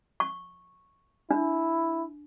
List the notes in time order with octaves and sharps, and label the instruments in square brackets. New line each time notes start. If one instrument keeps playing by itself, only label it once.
[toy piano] C#6
[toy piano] D4 [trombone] E4